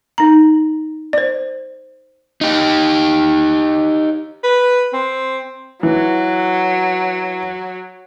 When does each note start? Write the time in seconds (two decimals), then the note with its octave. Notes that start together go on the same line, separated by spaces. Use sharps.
0.18 D#4 A#5
1.13 C5 D5
2.41 D#4 G4
4.44 B4
4.93 C4
5.83 E3 F#3